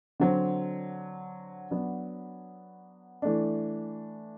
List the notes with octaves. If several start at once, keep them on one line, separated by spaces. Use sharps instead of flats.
D3 F#3 C4
F#3 B3 D4
E3 A3 D4